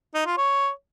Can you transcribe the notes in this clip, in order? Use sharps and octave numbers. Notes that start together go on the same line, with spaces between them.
D#4
F4
C#5